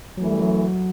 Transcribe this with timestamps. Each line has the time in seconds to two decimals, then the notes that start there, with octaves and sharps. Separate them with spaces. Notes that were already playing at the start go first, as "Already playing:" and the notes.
0.17 F#2 E3 F#3 A3
0.29 G3
0.42 F#3